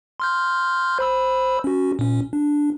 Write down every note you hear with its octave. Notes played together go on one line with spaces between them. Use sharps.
C6 F6 G6
C5 B5 E6
C#4 F#4
A#2 C#4
D4